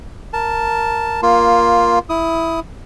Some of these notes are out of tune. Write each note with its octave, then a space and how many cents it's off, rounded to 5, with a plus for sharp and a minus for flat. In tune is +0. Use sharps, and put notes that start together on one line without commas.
A#4 +0 A5 +0
A#3 +10 F4 +0
E4 +0 D#6 +15